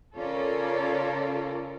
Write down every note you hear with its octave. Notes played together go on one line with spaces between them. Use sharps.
C#3 C#4 F4 A4 A#4 D5